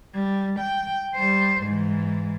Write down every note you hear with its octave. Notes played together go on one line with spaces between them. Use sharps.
G3
G5
G3 C5
G#2 E3